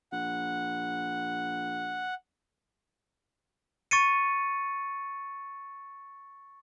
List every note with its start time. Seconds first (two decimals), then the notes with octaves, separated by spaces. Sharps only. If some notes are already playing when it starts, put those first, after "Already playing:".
0.12 A#1 F#5
3.91 C#6 A6 C#7 D#7